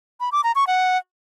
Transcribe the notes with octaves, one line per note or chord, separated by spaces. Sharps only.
B5
D6
A#5
C#6
F#5